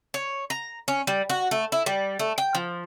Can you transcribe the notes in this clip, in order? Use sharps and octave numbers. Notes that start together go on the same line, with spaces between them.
C#5
A#5
C#4
G3
F#4
A3
E4
G3
A3
G5
F3